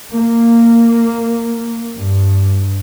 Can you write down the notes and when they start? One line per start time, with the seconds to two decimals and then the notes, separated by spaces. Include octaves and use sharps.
0.13 A#3
1.95 G2